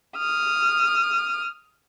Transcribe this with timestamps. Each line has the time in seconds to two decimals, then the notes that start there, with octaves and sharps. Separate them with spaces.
0.17 D#6 F6